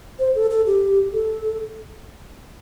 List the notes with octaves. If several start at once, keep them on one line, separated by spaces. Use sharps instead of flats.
C5
A4
A4
G4
A4